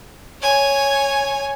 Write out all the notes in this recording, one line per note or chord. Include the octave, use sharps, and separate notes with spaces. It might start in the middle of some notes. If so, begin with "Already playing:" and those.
C#5 G#5